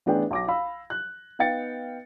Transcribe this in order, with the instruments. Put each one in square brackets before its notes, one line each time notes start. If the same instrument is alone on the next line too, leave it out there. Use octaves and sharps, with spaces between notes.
[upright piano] A1 B3 D4 G#4 G5
B1 D6 A#6
F5 B5 E6
F#6
B3 D#4 F5 G5 A6 C#7